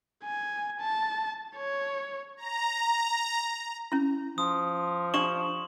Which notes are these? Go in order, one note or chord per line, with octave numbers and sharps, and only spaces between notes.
G#5
A5
C#5
A#5
C#4 E4
F3 D#6
D4 G4 D5 C#6 E7 F#7